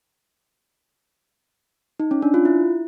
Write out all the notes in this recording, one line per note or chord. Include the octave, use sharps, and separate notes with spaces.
D#4
C#4
D4
F4
E4